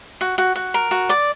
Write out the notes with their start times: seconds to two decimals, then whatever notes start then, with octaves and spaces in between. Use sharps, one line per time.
0.21 F#4
0.38 F#4
0.55 F#4
0.74 A#4
0.91 F#4
1.09 D5